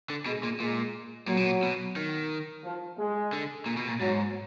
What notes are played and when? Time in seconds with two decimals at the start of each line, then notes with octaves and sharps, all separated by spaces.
0.10 D3
0.26 B2 G#3
0.43 A#2
0.60 A#2 G#3
1.28 A#2 F#3
1.37 B2
1.45 A#2
1.63 B2
1.96 D#3
2.64 F3
2.99 G#3
3.33 D3
3.66 A#2
3.77 B2
3.88 A#2
4.00 G#2 F#3